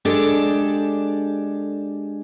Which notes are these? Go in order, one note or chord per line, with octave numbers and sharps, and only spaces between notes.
G#3 D4 G4 A4 D5